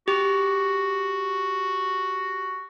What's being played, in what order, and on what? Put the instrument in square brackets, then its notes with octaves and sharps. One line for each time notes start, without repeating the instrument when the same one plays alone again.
[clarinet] F#4 [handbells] G4